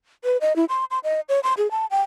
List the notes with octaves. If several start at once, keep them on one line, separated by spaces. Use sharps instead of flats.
B4
D#5
E4
C6
C6
D#5
C#5
C6
G#4
A5
G5